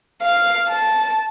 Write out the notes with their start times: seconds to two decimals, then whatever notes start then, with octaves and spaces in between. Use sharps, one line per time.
0.22 F5
0.69 A5